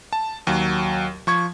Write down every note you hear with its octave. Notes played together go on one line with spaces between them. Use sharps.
A5
D#2 F#3
F3 C#6 G#6